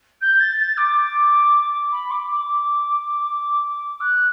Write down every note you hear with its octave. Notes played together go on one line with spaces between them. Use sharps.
G6
A6
A6
D6
B5
D6
D6
F#6